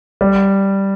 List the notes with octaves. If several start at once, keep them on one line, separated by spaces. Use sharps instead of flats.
G3